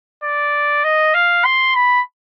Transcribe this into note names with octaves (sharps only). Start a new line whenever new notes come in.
D5
D#5
F5
C6
B5